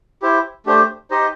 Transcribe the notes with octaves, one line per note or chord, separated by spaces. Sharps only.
E4 G4 C5
A3 D4 G4 C5
D#4 G4 C5 D#5